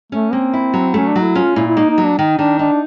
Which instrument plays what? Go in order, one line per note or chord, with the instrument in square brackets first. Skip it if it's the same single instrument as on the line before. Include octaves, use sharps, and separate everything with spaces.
[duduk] A3 [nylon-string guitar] C#4
[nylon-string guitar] A#3 [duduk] C4
[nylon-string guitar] E4
F#3
[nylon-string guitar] A3 [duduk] C#4
[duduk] D4
[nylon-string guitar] F#3
[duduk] E4
[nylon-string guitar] C#4 [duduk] F4
[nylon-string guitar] A#2 [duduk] E4
[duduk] E4
[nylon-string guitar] A#3 [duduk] D#4
[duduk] D#4
[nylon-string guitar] F#3
[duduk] D4
[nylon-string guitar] D#3 [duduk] D#4
[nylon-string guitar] D#3 [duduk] D4
[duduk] D4 [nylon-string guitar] D#4